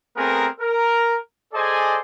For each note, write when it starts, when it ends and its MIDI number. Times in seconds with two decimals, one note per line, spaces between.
0.17 0.47 57
0.17 0.47 59
0.17 0.47 60
0.17 0.47 68
0.17 0.47 70
0.60 1.17 70
1.53 1.98 68
1.53 1.98 69
1.53 1.98 72
1.53 1.98 74
1.53 1.98 75
1.53 1.98 80